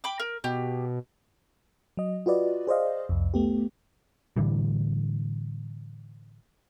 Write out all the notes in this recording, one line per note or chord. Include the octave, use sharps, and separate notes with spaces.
G5 B5 D6
A#4
B2 G4
F#3 D#5
F4 F#4 B4 D5 D#5
G#4 C5 D5 D#5 F5
C2 F2
A3 B3 G4
A2 D3 E3 G3